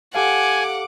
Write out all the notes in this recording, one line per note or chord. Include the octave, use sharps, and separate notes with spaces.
G4 A4 F5 F#5 G#5 D6